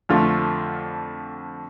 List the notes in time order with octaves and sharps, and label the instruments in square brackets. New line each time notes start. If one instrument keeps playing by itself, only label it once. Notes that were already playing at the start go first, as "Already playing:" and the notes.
[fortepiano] F2 D3 F3 A3 F4